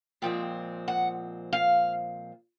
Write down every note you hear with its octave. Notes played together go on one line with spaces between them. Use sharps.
A#2 F3 G#3 C4 G5
F#5
F5